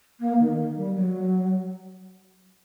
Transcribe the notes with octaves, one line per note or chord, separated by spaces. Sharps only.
A#3
D#3
D#3
G3
F#3